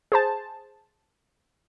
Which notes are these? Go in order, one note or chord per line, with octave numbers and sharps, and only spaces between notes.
G#4 C5 A5